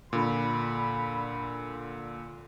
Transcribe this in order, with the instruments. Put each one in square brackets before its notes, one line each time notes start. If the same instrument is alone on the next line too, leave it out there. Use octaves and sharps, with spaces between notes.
[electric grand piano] A#2 D3 [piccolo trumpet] B5